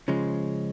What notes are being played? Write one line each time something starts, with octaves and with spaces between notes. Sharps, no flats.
C#3 F3 G#3